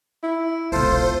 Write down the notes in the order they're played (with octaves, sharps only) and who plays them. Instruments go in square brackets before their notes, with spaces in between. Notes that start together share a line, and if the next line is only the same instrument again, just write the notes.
[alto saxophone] E4
[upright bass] E1 C2 [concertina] F4 A4 [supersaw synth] C5